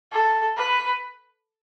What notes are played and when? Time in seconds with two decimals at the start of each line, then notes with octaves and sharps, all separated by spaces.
0.12 A4
0.57 B4